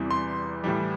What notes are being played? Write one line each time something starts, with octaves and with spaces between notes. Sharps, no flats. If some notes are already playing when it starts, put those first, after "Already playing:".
Already playing: E2 C3 E3 G3
C6
A2 E3 G3